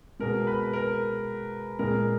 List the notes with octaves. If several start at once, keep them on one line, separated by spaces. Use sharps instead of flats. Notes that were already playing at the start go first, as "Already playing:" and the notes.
B2 G#3 A#4
B4
A#4
A#2 G#3 A#4